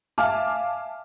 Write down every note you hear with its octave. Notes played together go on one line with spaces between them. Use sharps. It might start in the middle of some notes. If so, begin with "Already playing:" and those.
E5 F5 G#5 A5 D6 F6